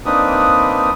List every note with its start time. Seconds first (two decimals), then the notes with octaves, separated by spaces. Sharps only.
0.06 A#3 C4 D4 D#4 B4 D#6